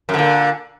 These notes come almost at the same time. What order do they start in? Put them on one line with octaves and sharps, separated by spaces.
F#2 D3 A#2